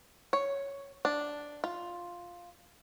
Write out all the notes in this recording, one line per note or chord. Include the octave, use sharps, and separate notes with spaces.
C#5
D4
F4